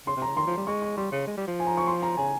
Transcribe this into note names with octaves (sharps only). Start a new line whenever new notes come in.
C#3 C6
C3
C#3 A#5
D#3 C6
F3
G3
G#3 C#6
C#6
G3 C6
C#3
G#3
G3
F3
G#5
A#5
C#6
C6
A#5
C#3 G#5